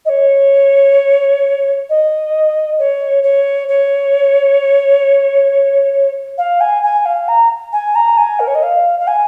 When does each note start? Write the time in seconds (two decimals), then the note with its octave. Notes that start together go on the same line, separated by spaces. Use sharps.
0.05 D#5
0.09 C#5
1.89 D#5
2.78 C#5
3.23 C#5
3.68 C#5
6.38 F5
6.60 G#5
6.83 G#5
7.05 F5
7.28 A#5
7.72 G#5
7.95 A#5
8.17 G#5
8.39 A#4
8.47 C#5
8.54 D#5
8.62 F5
8.99 F5
9.07 G#5